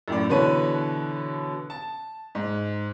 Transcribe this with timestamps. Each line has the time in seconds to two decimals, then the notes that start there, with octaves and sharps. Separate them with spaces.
0.08 F#2 A2 D5
0.29 B2 D3 E3 B4 C#5 D#7
1.70 A5
2.35 G#2